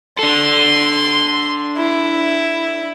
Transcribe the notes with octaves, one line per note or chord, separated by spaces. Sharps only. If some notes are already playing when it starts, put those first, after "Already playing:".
D4 A4 C6
E4